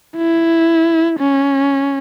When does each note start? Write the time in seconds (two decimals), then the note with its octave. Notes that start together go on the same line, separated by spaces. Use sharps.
0.17 E4
1.19 C#4